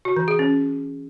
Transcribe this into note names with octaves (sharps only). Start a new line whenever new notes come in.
F#4
E3
G#4
C#4